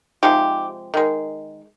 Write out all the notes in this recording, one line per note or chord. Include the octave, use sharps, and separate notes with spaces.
C3 F3 G#3 D#4 G4
D#3 G#3